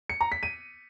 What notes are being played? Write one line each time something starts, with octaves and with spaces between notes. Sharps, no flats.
C#7
A#5
B6
D#7